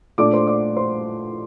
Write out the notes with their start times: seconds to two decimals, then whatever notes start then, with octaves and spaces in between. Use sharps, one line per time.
0.18 A#2 A3 D4 D5 D6
0.33 C5 C6
0.47 D5 D6
0.77 C5 C6